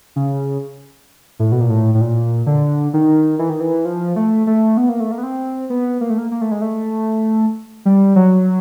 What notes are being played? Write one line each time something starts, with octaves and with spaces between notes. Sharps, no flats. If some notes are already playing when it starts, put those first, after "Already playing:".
C#3
A2
B2
A#2
A2
A2
A#2
D3
D#3
E3
D#3
E3
F3
A3
A3
B3
A#3
A3
A#3
B3
C4
B3
A#3
A3
A#3
A#3
A3
G#3
A3
G3
F#3